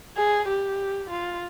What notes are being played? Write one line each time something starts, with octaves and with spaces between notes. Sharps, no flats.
G#4
G4
F4